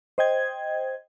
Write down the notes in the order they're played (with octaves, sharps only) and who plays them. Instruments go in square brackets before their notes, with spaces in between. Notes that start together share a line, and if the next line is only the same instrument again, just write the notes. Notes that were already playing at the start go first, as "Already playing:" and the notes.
[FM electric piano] C5 D#5 G5 G#6